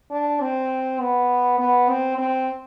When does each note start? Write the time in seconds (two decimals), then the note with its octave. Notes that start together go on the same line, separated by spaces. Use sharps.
0.11 D4
0.41 C4
1.00 B3
1.58 B3
1.89 C4
2.18 C4